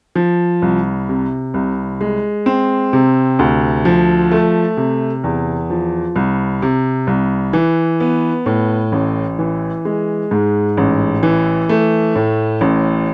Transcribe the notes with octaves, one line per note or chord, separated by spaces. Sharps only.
F3
C2
C3
C2
G#3
C4
C3
D2
F3
A3
C3
E2
F3
C2
C3
C2
E3
B3
A2
A1
E3
G#3
G#2
A1
E3
A3
A2
A1